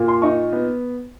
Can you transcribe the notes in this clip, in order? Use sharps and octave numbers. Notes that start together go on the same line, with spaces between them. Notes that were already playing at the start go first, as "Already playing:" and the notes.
Already playing: A#2 A#3
C6
D#4 C#6
B3